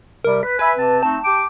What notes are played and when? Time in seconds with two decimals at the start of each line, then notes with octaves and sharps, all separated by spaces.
0.24 C3 G3 A#4
0.43 B4 B6
0.59 B4 E5 G#5 B5
0.77 C3 C4 A5
1.03 A3 C4 D#4 A5
1.24 G4 G5 D6